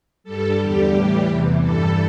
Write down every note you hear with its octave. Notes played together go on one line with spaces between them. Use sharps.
G2 G3 A4
E2 D3 G3 G4
A2 E3 G3
E2 C3 E3
G2 E3 G3 A4